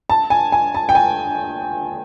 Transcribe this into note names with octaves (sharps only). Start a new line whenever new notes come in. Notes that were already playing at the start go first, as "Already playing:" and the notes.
A5
G#5
G#5
A5
G5
G#5